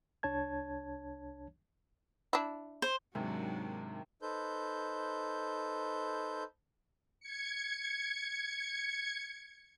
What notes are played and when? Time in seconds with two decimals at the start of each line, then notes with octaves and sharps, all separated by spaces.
0.23 C2 D4 C#5 A5 G#6
2.33 D4 E4
2.82 C5
3.15 D#2 G#2 C3 F#3 D4
4.22 D#4 A4 B4 C5 G6
7.20 G#6 C#7